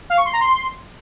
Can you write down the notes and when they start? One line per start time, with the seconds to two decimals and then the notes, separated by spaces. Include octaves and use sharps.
0.10 F5
0.17 C#6
0.25 C6
0.33 A#5
0.41 C6